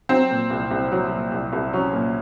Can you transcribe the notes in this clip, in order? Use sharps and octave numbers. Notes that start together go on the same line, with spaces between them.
F#3 C4
A#2
C2
C2
F#3
A#2
C2
C2
F#3 C#4
A#2